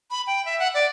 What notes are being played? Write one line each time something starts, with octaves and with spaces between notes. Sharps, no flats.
B5
G5
E5
F#5
D5